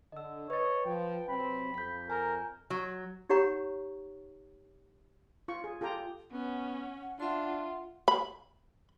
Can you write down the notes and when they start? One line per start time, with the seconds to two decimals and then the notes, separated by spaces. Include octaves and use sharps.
0.12 D3 D#5 E6
0.50 B4 C#5 D#5 A6
0.86 F3 G5
1.29 C3 F#3 C4 B5
1.74 F2 G6 B6
2.10 A#4 G#5 A#5 G6
2.70 F#3
3.29 D#4 G4 C#5 F#5 A#5 C#6
5.48 F4 C#6
5.64 G#4
5.81 F4 G4 A4 G5 A#5
6.32 B3 C#4 F#5
7.20 D4 F4 E5 C6
8.08 B5